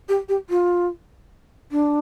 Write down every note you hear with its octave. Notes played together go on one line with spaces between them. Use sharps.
G4
G4
F4
D4